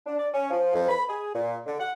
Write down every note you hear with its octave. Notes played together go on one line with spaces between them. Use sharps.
D4
D5
C#4
F3
F2
B5
G#4
A#2
D3
F#5